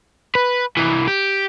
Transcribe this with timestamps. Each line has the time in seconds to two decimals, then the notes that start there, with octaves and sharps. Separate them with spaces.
0.35 B4
0.77 C2 E3
1.07 G4